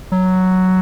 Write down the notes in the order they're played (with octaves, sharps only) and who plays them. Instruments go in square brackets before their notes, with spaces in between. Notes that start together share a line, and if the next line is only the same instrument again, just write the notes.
[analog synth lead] F#3